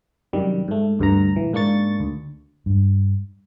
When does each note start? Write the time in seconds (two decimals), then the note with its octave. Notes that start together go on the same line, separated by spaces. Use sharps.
0.33 F#2 C3 D#3 G3
0.68 G#2 A3
0.99 D2 G2 D3 A#5
1.36 A#1 E3
1.53 G#2 A#3 D4 C#6 A6
2.00 D2
2.66 G2